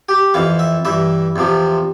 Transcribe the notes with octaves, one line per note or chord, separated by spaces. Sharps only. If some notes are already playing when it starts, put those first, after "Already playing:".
G4
F2 E3 F5
E5
G2 E3 E5
E2 C3 F3